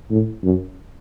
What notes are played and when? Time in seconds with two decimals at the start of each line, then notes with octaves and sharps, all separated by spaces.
0.11 A2
0.44 F#2